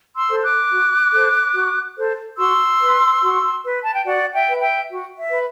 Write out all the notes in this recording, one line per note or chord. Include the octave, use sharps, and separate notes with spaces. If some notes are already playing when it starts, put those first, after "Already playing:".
C6 E6
A4 C5
D6 F#6
F#4
A4 C5
F#4
A4 C5
F#4 C6 E6
B4
F#4
B4
A5
G5
F#4 D5 F#5
E5 G5
B4
E5 G5
F#4
E5
B4